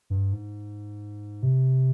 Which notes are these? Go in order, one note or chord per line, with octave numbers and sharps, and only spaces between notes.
G2
G#2
C3